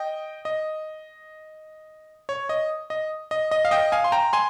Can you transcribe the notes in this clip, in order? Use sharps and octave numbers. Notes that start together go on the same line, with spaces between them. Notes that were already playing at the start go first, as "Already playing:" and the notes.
Already playing: D#5 G5
D#5
C#5
D#5
D#5
D#5
D#5
F5
D#5 G5
F5 G#5
C6
G5 A#5
G#5 C6